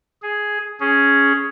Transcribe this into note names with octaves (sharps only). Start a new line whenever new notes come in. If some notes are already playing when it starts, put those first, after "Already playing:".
G#4
C#4 G#4